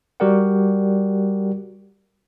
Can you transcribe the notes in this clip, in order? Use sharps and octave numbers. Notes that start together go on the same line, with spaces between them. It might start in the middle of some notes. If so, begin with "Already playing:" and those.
G3 F#4 G4 A#4 D5 F#5